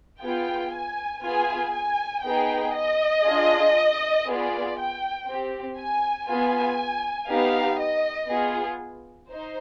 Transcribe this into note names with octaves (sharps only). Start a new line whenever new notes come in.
B3 F4 G#4 G5
G#5
B3 F4 G#4 G#5
G#5
B3 D#4 G#4 G5
D#5
D4 F4 G#4
B3 F4 G#4 D5
G5
C4 G4
G#5
B3 F4 G#4 G#5
B3 D#4 G4 F5
D#5
B3 F4 G#4
D#4 C5